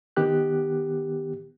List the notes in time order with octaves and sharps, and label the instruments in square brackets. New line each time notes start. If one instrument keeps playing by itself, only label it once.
[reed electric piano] D#3 B3 G4 F#6